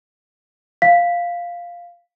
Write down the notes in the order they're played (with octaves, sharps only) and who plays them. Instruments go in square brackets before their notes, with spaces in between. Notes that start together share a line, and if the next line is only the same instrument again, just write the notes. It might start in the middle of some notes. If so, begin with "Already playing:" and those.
[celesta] F5 B6